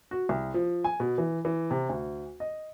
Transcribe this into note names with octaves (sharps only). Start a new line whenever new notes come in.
F#4
C2
F3
G#5
B2
E3
E3
C3
D2
D#5